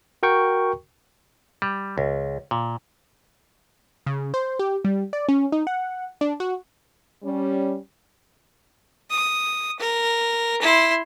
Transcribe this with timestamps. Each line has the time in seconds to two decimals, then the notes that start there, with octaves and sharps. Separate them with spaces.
0.23 F#4 A#4 G5 C#6
1.62 G3
1.98 C#2
2.51 A#2
4.06 C#3
4.34 C5
4.59 G4
4.85 G3
5.13 D5
5.29 C#4
5.52 D#4
5.67 F#5
6.21 D4
6.40 F#4
7.23 G3 C#4
9.10 D#6
9.80 A#4
10.61 E4 C6